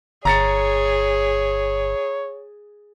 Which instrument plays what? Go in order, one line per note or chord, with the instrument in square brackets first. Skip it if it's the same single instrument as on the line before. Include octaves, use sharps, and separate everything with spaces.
[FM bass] G1 [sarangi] G#4 [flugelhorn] C#5 [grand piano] A#5 A6 C#7